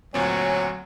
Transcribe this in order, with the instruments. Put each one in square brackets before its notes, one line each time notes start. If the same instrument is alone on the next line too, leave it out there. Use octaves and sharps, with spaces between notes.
[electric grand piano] D2 A#2 C4 [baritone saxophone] F#3 [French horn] C#5 [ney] G#5